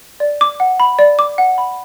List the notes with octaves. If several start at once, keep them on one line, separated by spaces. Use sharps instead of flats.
D5
D6
F#5
B5
D5
D6
F#5
B5